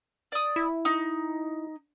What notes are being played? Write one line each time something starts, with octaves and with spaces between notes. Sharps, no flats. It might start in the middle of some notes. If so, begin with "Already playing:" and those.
D5 D#6
E4
D#4